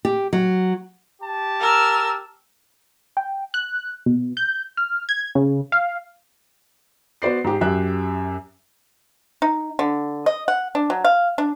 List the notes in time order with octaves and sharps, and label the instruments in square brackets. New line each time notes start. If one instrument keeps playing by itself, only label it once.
[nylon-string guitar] G4
F#3
[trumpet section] G4 A5
[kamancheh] A#4 E6
[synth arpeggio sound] G5
F#6
B2
G6
F6
G#6
C#3
F5
[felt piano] B3 F#4 C5 D5 C7
G#2 G4
F#2 G4 E5 F#6
[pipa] D#4
D3
D#5
F#5
D4
F#3
F5
D4